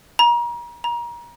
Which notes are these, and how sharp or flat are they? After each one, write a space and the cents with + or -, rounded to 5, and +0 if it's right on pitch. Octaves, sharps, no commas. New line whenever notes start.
A#5 +35
A#5 +30